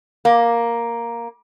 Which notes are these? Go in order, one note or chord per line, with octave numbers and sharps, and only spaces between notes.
A#3